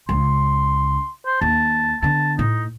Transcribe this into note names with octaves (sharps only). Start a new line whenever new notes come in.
C#2 C#3 C6
C5
D#2 A5
D3 B3 A5
A2 D#4